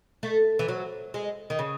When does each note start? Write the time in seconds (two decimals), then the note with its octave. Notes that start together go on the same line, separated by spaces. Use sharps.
0.23 A3
0.59 E3
0.68 F#3
1.14 G#3
1.50 D#3
1.59 C#3